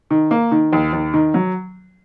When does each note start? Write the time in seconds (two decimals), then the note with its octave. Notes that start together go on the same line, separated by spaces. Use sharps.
0.11 D#3
0.31 A#3
0.51 D#3
0.73 D#2
0.93 D#2
1.14 D#3
1.34 F#3